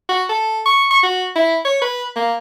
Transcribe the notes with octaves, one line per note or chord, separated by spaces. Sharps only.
F#4
A4
C#6
C#6
F#4
E4
C#5
B4
A#3